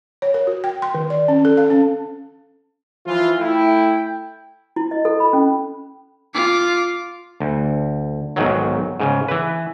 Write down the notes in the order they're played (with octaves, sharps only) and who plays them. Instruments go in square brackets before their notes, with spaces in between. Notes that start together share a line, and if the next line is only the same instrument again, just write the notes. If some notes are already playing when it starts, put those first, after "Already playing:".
[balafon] C#5
A#4
F#4
G5
C6
D#3
D5
C#4
A4
F5
C#4
[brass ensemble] E3 F3 F4
[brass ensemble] A3 E4 [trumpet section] G5
[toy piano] E4
D#5
A4
B5
C#4
[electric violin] F4 D6
[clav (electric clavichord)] D2
B1 G#2 D#3 F#3
G#2 C#3
E3 B4